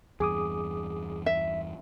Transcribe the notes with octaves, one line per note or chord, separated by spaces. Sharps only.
E2 G2 G#4 D6 D#6
E5